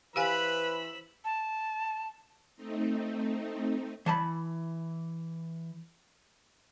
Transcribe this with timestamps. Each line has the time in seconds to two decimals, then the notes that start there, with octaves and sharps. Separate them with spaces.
0.16 E3 G4 B4 C5 F5 G#5 B5 E6
1.25 A5
2.56 A3 C4 D#4
4.06 E3 A5 B5